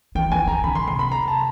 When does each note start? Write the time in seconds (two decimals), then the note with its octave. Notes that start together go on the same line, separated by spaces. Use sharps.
0.15 E3 G5
0.32 E3 G#5
0.47 E3 A#5
0.64 D3 B5
0.75 C6
0.87 C3 C6
0.99 B5
1.12 A#5
1.28 A5